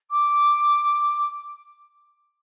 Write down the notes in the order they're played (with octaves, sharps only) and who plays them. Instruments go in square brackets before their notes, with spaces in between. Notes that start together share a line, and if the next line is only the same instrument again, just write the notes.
[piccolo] D6